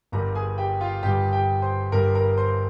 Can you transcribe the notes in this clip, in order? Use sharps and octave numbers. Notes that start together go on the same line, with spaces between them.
G1 G2 G3 A#4 A#5
G#4 G#5
G4 G5
F4 F5
G1 G2 G3 G4 G5
G4 G5
C5 C6
G1 G2 G3 A#4 A#5
A#4 A#5
C5 C6